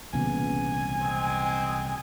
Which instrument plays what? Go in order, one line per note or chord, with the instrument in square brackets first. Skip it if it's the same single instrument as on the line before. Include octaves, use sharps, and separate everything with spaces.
[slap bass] C2 E3 A#3 [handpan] A#2 C#3 B3 [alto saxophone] G#5
[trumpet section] G#3 C4